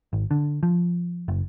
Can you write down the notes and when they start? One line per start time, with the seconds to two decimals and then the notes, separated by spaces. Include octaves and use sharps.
0.13 G#1
0.31 D3
0.63 F3
1.28 F#1